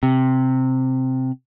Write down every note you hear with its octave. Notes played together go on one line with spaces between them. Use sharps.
C3